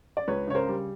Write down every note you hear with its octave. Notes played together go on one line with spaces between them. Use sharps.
D5
C#2 B4 C#5
C#3 C#5
A#4 C5
G3